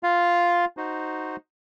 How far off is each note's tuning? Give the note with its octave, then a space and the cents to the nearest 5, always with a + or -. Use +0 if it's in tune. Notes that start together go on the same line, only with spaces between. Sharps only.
F4 +0 F5 +0
D#4 +0 F#4 +0 C5 +0